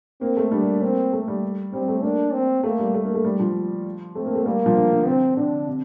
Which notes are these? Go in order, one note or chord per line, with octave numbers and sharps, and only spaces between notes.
A#3 C4
A3
G3 D4
A#3
A#3 C4
A3
G3
G3 C4
A3
A#3 D4
C4
A3 A#3
G3
A3
A#3
A3
G3
F3
A3 C4
A#3
A3
G3 A#3
F3
D3
D3
C3 C4
D3 D4
C3